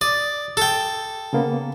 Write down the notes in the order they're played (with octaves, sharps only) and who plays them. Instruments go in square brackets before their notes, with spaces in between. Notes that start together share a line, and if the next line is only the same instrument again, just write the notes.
[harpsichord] D5 [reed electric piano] D#6
[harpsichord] A4 G5
[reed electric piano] C#3 A#3 B3